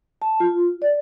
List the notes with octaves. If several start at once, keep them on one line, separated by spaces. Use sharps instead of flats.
A5
F4
D5